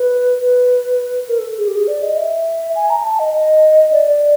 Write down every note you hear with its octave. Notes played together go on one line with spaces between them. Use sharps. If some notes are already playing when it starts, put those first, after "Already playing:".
Already playing: B4
B4
A#4
A4
G#4
G4
G#4
D5
D#5
E5
G#5
A#5
A5
D#5
D#5
D5
D5